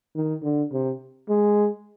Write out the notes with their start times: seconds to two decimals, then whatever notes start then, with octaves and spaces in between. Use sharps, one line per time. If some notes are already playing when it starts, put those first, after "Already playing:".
0.15 D#3
0.43 D3
0.72 C3
1.29 G#3